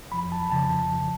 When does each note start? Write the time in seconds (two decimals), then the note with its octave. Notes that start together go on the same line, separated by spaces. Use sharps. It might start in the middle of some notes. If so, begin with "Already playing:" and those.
0.12 F2 F3 B5
0.32 A5
0.52 F2 C#3 F3 A5
0.91 F3